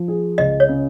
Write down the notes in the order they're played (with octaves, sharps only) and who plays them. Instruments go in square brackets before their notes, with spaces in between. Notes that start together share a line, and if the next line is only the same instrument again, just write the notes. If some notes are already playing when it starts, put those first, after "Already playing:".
Already playing: [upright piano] F3
G#4
[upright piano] C#2 [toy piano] D#5
[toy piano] C#5
[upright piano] C#3